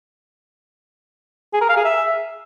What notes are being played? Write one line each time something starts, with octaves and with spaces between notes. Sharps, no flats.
G#4
A#4
F5
G#4
E5